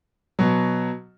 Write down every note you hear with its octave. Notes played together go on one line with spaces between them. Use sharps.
B2 F#3